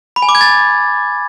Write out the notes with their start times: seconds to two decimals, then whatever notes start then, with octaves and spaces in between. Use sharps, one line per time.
0.16 B5
0.22 G#5
0.29 D6
0.35 G#6
0.41 A6